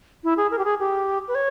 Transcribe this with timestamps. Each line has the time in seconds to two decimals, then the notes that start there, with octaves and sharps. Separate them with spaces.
0.24 E4
0.37 G#4
0.51 A#4
0.58 G4
0.65 G#4
0.80 G4
1.28 B4
1.35 C#5